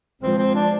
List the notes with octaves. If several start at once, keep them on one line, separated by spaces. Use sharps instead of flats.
F3 G#3 C4
C4
D4